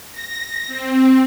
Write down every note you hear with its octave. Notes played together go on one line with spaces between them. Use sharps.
A#6
C4